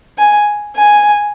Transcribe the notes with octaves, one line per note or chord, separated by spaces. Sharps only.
G#5
G#5